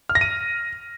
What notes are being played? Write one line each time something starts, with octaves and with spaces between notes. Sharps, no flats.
F6
A#6
D#7